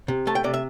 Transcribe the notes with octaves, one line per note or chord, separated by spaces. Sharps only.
C3
A3 A5
G5
C3 D5
E5